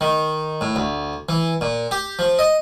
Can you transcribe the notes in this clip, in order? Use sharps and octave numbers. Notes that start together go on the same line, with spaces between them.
D#3
A2
D2
E3
A#2
G4
F3
D#5